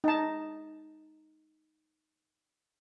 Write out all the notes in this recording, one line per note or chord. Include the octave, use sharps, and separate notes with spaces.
D#4 A5